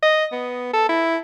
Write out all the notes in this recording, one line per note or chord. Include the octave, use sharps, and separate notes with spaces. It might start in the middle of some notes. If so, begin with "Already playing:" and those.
D#5
B3
A4
E4